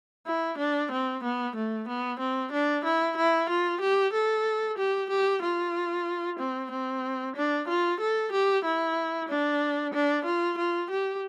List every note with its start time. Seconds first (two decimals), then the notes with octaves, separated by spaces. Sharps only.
0.26 E4
0.58 D4
0.91 C4
1.23 B3
1.56 A3
1.88 B3
2.19 C4
2.52 D4
2.84 E4
3.17 E4
3.49 F4
3.81 G4
4.13 A4
4.78 G4
5.10 G4
5.42 F4
6.39 C4
6.71 C4
7.36 D4
7.68 F4
8.00 A4
8.32 G4
8.64 E4
9.29 D4
9.93 D4
10.25 F4
10.58 F4
10.90 G4